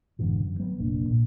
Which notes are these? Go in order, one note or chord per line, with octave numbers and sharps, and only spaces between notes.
F1 G#2 D3 E3
F#2
F#3 G3 B3
F1 A#1 A#3 D4
A#2